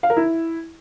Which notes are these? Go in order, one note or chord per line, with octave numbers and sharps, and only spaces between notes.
F5
A#4
E4